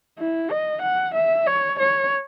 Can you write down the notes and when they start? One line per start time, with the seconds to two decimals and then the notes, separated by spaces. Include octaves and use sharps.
0.19 E4
0.51 D#5
0.82 F#5
1.15 E5
1.47 C#5
1.80 C#5